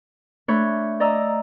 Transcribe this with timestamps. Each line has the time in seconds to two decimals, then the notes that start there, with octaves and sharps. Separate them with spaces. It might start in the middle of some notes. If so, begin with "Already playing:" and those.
0.48 A3 D4 C#5 B5 F#6 G6
1.00 D5 D#5 A#5 E6